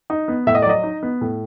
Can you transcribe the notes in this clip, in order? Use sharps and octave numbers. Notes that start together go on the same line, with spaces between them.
D#4
B3
A2 E5
D#5
D5
F#3 D#5
D#4
B3
A2